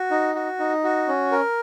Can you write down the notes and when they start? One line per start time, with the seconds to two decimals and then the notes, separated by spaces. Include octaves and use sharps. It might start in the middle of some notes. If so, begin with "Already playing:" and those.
Already playing: F#4
0.11 D#4
0.35 F#4
0.59 D#4
0.84 F#4
1.08 C#4
1.32 A#4